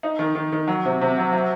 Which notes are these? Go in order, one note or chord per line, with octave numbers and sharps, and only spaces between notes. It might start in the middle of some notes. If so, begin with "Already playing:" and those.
D#4
D#3
D#3
D#3
F#3
C3
C3
F#3
F#3